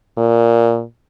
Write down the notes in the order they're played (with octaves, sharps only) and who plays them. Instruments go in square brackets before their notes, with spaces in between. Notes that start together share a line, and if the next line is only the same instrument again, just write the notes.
[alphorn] A#2